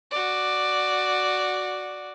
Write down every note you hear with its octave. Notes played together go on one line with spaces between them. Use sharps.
F#4 D5